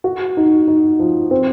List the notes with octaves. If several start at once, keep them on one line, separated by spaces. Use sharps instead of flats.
F#4
D#4
D#4
F3
C4